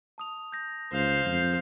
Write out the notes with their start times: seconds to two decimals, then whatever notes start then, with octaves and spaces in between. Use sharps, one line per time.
0.18 A5 D#6 F7
0.52 G6 A#6
0.92 C#2 C5 F5
1.26 F2 G6